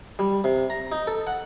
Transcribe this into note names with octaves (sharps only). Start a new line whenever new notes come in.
G3
C3
A#5
D#4
A4
F#5